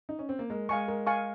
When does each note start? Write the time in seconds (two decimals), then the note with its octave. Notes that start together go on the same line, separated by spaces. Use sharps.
0.09 D#4
0.19 C#4
0.29 C4
0.39 A#3
0.50 G#3 A#4
0.69 G#3 F5 G#5 C#6
0.88 G#3 A#4
1.07 F5 G#5 C#6